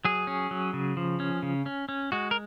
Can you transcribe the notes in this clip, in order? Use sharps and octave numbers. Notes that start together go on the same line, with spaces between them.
F#3 G#4
C#4
F#3
C#3
F3
C#4
C#3
C#4
C#4
G#3 F#4
A#4